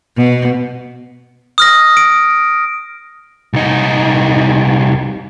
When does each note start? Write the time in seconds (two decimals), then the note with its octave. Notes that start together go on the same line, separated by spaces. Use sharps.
0.17 B2
1.58 D#6 F6 A#6
1.97 D7
3.53 C2 D#4